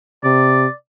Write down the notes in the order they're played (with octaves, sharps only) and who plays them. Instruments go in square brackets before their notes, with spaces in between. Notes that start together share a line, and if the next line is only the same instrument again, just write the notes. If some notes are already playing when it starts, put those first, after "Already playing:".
[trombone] C3 [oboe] D5